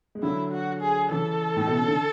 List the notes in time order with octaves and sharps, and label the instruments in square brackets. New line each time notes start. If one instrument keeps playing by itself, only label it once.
[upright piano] G#3
[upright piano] D3 F#3 [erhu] E4
[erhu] F#4
G#4
[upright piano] C#3 E3 [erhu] A4
[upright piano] A2
B2
C#3
D3